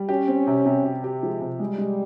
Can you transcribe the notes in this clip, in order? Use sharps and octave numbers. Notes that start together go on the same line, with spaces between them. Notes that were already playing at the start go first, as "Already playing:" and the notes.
Already playing: G3
C#4 G4
C4
C3
C3
G4
G4
F3 G#3
C3
G3 G#3
G#3